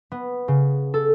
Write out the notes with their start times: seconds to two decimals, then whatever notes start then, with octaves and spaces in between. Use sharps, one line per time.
0.12 B3
0.48 C#3
0.94 A4